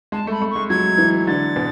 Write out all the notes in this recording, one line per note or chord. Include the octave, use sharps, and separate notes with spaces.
G#3 A5
A3
B5
A3
C#6
G#3
F#3 G#6
E3
D3 A6
B2